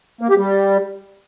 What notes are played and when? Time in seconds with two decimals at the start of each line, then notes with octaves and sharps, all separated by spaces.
0.21 A#3
0.29 G4
0.38 G3